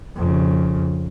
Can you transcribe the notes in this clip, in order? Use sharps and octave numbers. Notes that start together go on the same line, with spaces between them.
F2 C#3